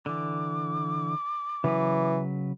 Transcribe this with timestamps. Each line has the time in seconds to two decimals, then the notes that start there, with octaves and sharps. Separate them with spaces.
0.06 D3 E3 D6
1.64 C#3 E3 F#3 B4